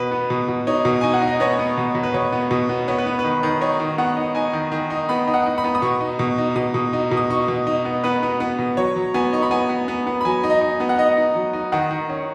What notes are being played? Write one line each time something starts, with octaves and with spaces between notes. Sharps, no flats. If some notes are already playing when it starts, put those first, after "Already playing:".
Already playing: B2 B4
B3
B2
B2
D#4 C#5
B2
D#4 G#5
F#5
D#4
D#5
B3 C#5
B3
B2
B2
B4
B2 C#5
B3
B2
B3
B3 C#5
B4
B3
B4
D#3
D#3
D#4 C#5
D#3
B3 F#5
D#4
D#4 G#5
D#3
D#3
D#4
B3 B5
D#4
F#5
D#4
B5
B3
D#6
B2 C#6
D#4
B2
D#4
B2 D#6
B2
D#4
B2
D#6
D#4 C#6
B2
D#4
B3
B3 B4
B3
B3
B2
F#3 C#5
F#3
B3 G#5
D#4 C#6
B5
B3 G#5
B3
B3
B3
B5
F#3 G#5
D#4
D#5
D#4
B3
F#5
D#4 D#5
D#4
F#3
D#4
D#3 F#5
D#3
C#4